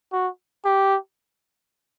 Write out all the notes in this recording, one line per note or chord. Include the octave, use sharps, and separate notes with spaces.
F#4
G4